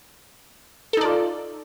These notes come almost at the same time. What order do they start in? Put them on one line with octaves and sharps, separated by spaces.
A4 D#4 D5 F4